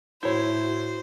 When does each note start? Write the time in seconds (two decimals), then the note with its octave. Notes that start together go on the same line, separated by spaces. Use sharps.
0.23 A2 E4 F#4 C5 C#5 B5 G6